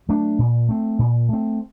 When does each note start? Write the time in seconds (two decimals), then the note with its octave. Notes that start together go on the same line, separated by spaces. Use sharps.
0.09 F#3 A3 D4
0.39 A#2
0.69 A3 C4
0.99 A#2
1.29 A3 C4